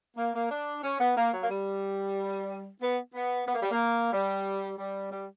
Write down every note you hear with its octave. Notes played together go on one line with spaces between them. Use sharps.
A#3
A#3
D4
C#4
B3
A#3
F#3
A#3
G3
B3
B3
B3
A#3
G3
A#3
G3
G3
G3